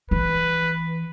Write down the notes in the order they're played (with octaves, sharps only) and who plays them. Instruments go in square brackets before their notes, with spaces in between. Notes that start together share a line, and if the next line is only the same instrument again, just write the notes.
[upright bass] E3 [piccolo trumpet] B4